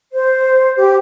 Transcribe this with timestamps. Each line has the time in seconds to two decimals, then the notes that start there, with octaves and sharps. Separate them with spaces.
0.12 C5
0.76 G4